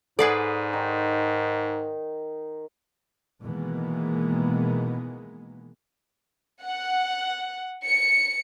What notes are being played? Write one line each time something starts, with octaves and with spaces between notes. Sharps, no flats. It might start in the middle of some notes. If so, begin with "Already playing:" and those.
G#2 G#4 A4 B4 D5 F#5
D#3
B2 D#3 E3 G#3 A#3 B3
F#5
C#7